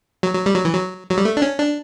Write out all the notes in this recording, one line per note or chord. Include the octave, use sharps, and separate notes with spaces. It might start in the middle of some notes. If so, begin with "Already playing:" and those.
F#3
F#3
G3
F#3
E3
F#3
F#3
G3
A3
D4
C#4
D4